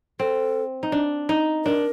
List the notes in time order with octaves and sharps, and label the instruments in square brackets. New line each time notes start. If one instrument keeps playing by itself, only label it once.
[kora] C4 [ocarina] A4
[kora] D#4
D4
D#4
[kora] D4 [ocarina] A#4